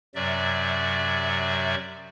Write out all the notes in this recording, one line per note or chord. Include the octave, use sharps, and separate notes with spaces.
F#2 C3 F#3 D5 E5